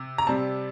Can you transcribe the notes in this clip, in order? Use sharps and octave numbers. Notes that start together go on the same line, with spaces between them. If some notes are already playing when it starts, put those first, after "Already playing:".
Already playing: C3
A#5
C3 G3 C4 A5